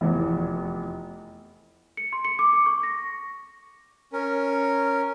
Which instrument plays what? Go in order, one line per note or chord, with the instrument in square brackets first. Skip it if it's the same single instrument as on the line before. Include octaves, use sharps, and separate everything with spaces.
[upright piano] F1 E2 E3
[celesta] C#7
C6
C#7
D6
D6
C#6
A#6
[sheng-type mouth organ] C#4 A#4